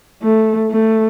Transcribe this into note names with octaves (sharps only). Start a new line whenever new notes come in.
A3
A3